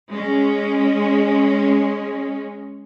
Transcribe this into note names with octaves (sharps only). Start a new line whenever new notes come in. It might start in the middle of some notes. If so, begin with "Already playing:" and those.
G#3 C#4